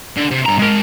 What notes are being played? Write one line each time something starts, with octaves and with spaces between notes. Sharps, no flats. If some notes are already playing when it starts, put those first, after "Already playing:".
D3
C3
G2 A#5
G#3 A#4